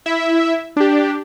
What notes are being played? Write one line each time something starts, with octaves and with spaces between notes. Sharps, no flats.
E4 E5
D4 G4